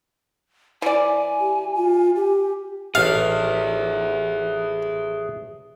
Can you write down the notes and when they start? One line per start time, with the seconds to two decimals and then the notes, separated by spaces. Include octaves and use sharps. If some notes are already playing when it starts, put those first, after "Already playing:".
0.82 E3 D5 G#5
1.40 G4
1.77 F4
2.16 G4
2.95 A1 G#4 A4 E5 F5